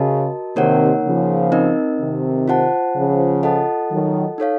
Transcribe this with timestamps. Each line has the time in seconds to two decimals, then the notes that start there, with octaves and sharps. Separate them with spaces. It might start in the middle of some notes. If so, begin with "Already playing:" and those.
Already playing: C#3 F#4 A#4 D#5 A5
0.56 C3 D#3 A#3 D#4 A#4 C#5 F#5
1.04 C#3 F3
1.52 C4 D#4 A#4 D#5
1.99 C3 D#3
2.48 F4 C5 F#5 A5
2.95 C#3 F3
3.43 F4 A4 D#5 F#5 A5
3.91 D#3 F#3
4.38 D#4 A4 C#5 F5